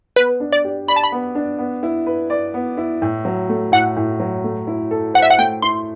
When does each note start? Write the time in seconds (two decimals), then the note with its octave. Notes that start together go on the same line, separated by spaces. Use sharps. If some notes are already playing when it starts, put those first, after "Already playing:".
0.16 B3 B4
0.40 D4
0.52 D5
0.65 G4
0.88 D5 B5
0.96 A5
1.04 B5
1.12 B3
1.35 D4
1.58 B3
1.83 E4
2.06 B4
2.30 D5
2.54 B3
2.77 E4
3.02 A2
3.25 F#3
3.49 A3
3.72 A2 F#5
3.96 A2
4.20 F#3
4.44 A3
4.67 E4
4.91 A4
5.14 C5 F#5
5.22 E5
5.30 F#5
5.38 A3 G5
5.62 E4 C6